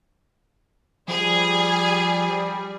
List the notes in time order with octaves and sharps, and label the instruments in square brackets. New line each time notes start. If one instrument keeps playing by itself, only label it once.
[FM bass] F3 [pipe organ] G3 [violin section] G#4